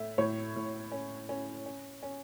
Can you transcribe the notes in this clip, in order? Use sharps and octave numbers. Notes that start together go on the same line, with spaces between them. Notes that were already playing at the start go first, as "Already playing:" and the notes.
Already playing: A2 A3 E5
A2 C#5
A2
C#4
C#4
C#4
C#4